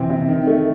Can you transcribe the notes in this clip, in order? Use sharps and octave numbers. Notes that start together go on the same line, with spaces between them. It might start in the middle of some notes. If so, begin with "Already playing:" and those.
Already playing: C3 E3 C4
C3
D#3
A3